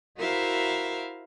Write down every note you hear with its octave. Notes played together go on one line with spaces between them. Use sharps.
E4 F#4 A#4 C5 E5 F5